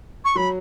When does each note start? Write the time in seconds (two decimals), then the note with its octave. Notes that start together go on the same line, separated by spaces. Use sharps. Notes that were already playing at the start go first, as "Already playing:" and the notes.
0.24 C#6
0.35 F#3 B5